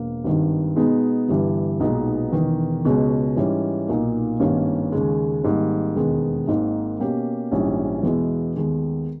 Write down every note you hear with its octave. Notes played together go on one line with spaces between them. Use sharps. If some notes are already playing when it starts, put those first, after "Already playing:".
Already playing: E1 A#3
G#1 G2 D#3
B2 G#3 B3 D#4
G1 G2 E3 G3
B1 A#2 G#3 B3 D#4
E1 E2 D#3
C#2 B2 G#3 C#4
G#2 E3 G3 C#4
B1 A#2 A#3 D#4
G#1 G2 D#3 A#3 C#4
D#2 C#3 G#3
G#1 G#2 G3 A#3
E1 D#2 D#3 G#3 B3
G#1 G#2 D#3 A#3
B2 A#3 C#4 G4
A#1 G#2 E3 G3 C#4
E2 B2 G#3 B3 E4
D#2 D#3 G#3 B3